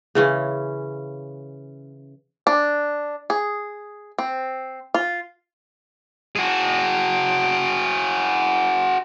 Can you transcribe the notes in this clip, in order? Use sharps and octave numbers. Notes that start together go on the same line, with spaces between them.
C#3 E3 C#4
D4
G#4
C4
F4
F#4 G#4